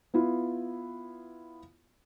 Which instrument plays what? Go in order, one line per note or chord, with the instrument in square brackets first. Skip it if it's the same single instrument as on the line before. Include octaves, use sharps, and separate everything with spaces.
[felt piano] B3 E4 F4